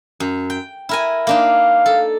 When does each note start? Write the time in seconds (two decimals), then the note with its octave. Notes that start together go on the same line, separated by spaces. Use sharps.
0.20 F#2
0.50 G5
0.89 E4 A#4 G#5
1.27 A#3 D4 D#4 F5
1.86 A4